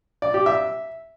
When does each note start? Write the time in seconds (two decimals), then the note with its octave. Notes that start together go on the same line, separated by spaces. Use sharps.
0.22 D5
0.34 G4
0.46 E5